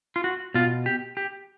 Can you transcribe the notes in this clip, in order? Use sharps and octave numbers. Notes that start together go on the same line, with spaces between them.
F4
F#4
B2 F4
G4
G4